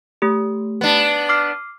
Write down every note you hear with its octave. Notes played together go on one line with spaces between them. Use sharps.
A3 G4
B3 D4
D6 F6 C7